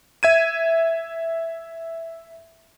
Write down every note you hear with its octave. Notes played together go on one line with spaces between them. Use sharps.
E5 G#6 D#7